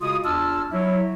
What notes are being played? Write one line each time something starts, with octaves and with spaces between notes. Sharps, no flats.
C#3 G#3 F4 F#4 D#6
E2 D4 F4 A5 E6 F6
F#3 E4